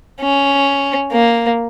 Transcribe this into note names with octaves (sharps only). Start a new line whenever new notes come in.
C#4
A#3